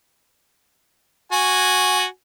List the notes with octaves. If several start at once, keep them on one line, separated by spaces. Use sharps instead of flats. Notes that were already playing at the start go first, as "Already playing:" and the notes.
F#4 G#5